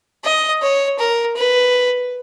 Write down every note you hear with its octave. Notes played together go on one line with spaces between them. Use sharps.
D#5
C#5
A#4
B4